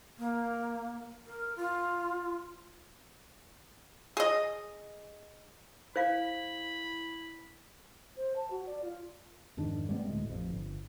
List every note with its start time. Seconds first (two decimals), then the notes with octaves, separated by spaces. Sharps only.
0.19 A#3
1.27 A#4
1.56 F4
4.17 G#4 D#5
5.96 E4 C5 F5 B5
8.17 C5
8.36 A5
8.50 F#4
8.67 D5
8.83 F4
9.57 F2 G#2 D#3 D4
9.89 G3 A3 B3 C4
10.05 D2 A2 G#3 A3
10.26 A1 F2
10.50 G1